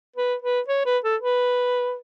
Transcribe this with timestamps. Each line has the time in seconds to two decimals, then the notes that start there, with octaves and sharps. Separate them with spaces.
0.16 B4
0.42 B4
0.68 C#5
0.86 B4
1.04 A4
1.21 B4